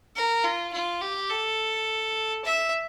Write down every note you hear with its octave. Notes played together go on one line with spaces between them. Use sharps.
A#4
F4
F4
G4
A4
E5